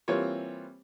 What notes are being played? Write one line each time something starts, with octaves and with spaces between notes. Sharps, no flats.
E3 G3 A#3 C4 F4 C#5